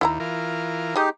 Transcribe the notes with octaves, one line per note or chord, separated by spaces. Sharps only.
D#2 E4 F#5 A#5
E3 F4 A#4
G#3 D#4 G4 D#5